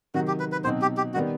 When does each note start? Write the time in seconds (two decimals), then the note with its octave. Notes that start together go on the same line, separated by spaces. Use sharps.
0.14 C3 D#3 F#3 F#4
0.27 G4
0.40 B4
0.52 B4
0.64 B2 F#3 C4 D#4 C5
0.82 G4
0.97 G4
1.14 D#3 G3 B3 F#4